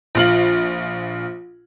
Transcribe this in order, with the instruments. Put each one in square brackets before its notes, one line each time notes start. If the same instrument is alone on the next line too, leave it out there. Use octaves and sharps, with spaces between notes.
[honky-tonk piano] A#1 F4 F#7